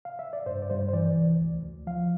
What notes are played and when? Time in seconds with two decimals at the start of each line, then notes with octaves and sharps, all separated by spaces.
0.05 F5
0.19 E5
0.33 D5
0.46 G2 C5
0.62 D5
0.70 G2 C5
0.89 C5
0.93 E3 D5
1.17 C2
1.40 D2
1.64 D2
1.87 F3 F5